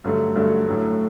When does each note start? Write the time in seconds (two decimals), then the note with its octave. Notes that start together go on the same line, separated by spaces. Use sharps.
0.04 G2 D3 F#3 A3
0.35 G2 D3 F#3 A3
0.67 A2 F#3 A3